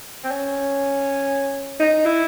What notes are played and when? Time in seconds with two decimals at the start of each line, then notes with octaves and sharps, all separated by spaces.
0.24 C4
0.31 C#4
1.80 D#4
2.05 E4